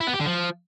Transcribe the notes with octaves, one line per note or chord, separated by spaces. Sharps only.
E4
B3
G4
D3
F3